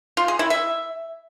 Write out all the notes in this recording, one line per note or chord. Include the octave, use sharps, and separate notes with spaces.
F4
G#4
E4
E5